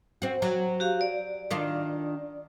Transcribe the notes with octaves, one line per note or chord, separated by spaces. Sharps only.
C4 F#4
F#3
F#4 G4 F5
D5
D#3 D4 F4